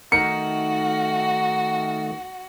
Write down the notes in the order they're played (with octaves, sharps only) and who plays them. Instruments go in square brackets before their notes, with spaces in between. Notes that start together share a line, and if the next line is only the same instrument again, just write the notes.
[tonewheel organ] D#3 A3 [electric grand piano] D#4 A#4 [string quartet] F#4 [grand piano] C#7